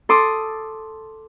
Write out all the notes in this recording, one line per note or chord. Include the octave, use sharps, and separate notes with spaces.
A4 C6 D6 D#6